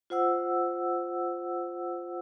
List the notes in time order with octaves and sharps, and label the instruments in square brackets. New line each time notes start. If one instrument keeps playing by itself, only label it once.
[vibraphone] F4 C5 F#5 E6